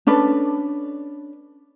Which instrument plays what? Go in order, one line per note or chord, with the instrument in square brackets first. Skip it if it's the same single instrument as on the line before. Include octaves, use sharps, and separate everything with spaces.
[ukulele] C#4 D4 A4 B4